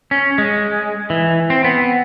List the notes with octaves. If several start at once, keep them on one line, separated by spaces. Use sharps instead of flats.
C#4
G#3
E3
C4
B3